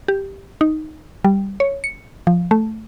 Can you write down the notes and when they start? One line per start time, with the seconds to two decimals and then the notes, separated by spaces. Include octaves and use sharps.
0.08 G4
0.61 D#4
1.24 G3
1.60 C#5
1.84 C#7
2.27 F3
2.51 A3